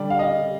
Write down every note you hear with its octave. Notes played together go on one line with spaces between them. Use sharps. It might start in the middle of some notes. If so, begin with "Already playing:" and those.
Already playing: D3 G3 D4 D5
F5
D#5